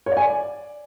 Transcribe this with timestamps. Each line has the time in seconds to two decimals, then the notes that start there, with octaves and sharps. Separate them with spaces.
0.06 C#5
0.12 D5
0.17 G#5
0.22 D5